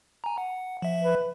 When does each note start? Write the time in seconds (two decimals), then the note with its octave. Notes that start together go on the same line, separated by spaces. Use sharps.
0.24 G#5 A#5
0.38 F#5
0.82 F3 E5
1.02 B4